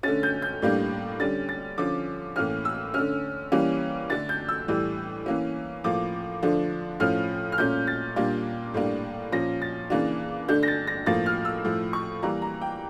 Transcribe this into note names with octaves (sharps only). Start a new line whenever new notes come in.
D3 A3 C#4 A6
G6
G6
A2 G3 A#3 D4
D3 G3 C#4 A6
A6
D3 F3 C#4 D6
A2 E3 A#3 C#4 F6
E6
D3 A3 C#4 F6
E3 G3 A#3 C#4
D3 A3 D4 A6
G6
E6
A2 E3 G3
E3 A#3 C#4
A2 F3 A#3 D6
D3 F3 A3 D4
A2 F3 C#4 F6
F6
A#2 A3 C#4 G6
A6
A#2 G3 A#3 D4
A2 G3 A#3 D4
A#2 F3 C#4 A#6
A6
C#3 E3 A#3 D4
D3 A3 D4 G6
A#6
A6
A#6
A2 F3 A#3 A6
F6
E6
A2 F3 A3
C#6
E3 G3 A#3 A#5
A#5
G5